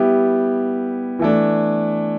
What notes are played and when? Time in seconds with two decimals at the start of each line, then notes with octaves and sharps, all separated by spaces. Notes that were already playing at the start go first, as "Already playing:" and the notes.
Already playing: G3 B3 E4 G4
1.19 E3 A3 D4